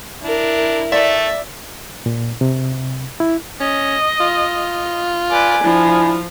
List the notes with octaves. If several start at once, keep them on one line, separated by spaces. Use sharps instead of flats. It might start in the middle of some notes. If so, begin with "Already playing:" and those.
D4 E4 A#4
A3 D5 E5
A#2
C3
E4
C#4 D#5
F4
B4 D5 G#5
F3 D4 E4